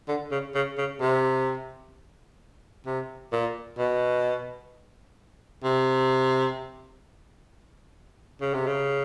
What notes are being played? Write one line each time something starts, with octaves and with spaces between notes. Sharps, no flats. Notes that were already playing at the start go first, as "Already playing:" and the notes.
D3
C#3
C#3
C#3
C3
C3
A#2
B2
C3
C#3
C3
C#3